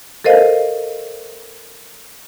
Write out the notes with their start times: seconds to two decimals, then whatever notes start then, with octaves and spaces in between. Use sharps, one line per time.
0.24 A4 A#4 C5 D#5 F5